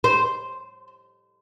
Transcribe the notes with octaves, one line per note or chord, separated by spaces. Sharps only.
C5